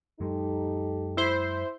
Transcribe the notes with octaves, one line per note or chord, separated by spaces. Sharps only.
F#2 F#3 G#3 D#4 G4 A4
E4 C5